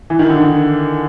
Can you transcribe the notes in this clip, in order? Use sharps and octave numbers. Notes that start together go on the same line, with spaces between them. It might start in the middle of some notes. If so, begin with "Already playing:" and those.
E3
D#3
D3
D#3